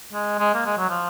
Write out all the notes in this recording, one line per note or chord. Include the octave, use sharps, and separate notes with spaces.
G#3
G#3
A#3
G#3
F#3
F3